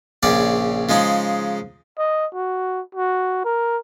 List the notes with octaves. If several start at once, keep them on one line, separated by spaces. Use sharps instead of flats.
A#1 C#3 C#4 D5
C#3 F3 G#3 D#4
D#5
F#4
F#4
A#4